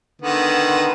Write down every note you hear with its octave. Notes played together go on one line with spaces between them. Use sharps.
D3 D#3 B3